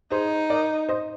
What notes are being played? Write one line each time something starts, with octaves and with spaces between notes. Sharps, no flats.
D#4 G#4 C5
A#4 D5
C5 D#5